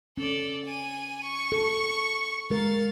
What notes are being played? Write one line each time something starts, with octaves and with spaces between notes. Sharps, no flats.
C#4 A4 D5
G#5 D#7
C#6
A4
G#3 A#4 F5 A6